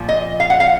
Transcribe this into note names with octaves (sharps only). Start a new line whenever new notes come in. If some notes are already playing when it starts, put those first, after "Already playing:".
Already playing: A#2 F3
D#5
F5
F#5
F5